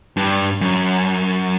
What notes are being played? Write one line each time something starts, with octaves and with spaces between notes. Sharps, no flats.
G2
F#2